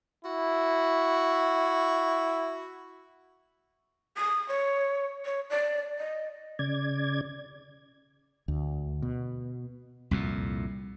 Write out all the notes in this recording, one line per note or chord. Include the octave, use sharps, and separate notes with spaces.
E4 F#4
D#6
C#5
C#5
D5
D#5
C#3 D5 G#6
D2
B2
C2 F2 A#2